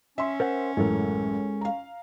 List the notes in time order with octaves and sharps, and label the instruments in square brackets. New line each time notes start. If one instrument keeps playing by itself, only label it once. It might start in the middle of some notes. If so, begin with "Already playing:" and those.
[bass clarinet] C#4 [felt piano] E5 C6
[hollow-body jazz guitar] A#4 C5 F#5
[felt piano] A1 F#2 A2 [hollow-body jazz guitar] G#3 A4 A#4
[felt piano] F5 A#5